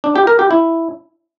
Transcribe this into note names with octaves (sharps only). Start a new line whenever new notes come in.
D4
G4
A#4
G4
E4